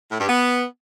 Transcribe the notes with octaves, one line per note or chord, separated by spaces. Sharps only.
A2
G2
B3